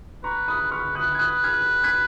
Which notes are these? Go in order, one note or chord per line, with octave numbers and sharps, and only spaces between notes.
B4 A#5 C#6
B5 D#6
B4 C#6 F6
D#6 F#6
G#6
D#6 F#6
F6 G#6
G#6 B6